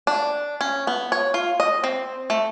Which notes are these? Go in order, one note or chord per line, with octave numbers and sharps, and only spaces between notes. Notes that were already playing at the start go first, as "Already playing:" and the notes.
D4
C#4
B3
C#5
F4
D#5
C4
A3